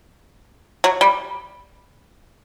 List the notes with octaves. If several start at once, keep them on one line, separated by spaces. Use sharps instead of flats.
F#3
G3